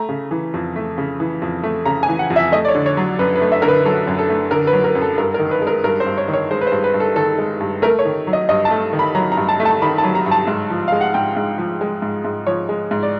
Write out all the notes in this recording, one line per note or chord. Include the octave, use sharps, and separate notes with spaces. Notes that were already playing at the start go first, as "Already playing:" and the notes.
Already playing: A3 A#5
C#3
E3
F2
A3
C#3
E3
F2
A3
C#3 A#5
G#5
E3
F#5
F2
E5
A3 D#5
D5
C#5
D3
C#5
F#3
F#2 B4
B4
A3
E5
D3 A#4
B4
F#3 A4
F#2
A4
A3
D3 A#4
B4
F#3
A#4
F#2
A4
G2 A#4
A#4
D#3
B4
G#3
A#4
G2 A#4
C5
G2
C#5
D#3
C#5
G#3 C5
B4
C5
G2
B4
G2
A4
D#3 A4
G#3
G2
A3 A#4
C#5
D#3
F#3
D#5
G2 D#5
A5
A3
D#3
B5
F#3 A#5
A#5
G2
A5
A3
A5
D#3 B5
A5
F#3
A#5
G2
A5
G#2
F3
G#3 F5
F#5
G#2 G5
G#2
F3
G#3
G#2
G#2
F3 C#5
G#3
G#2
D5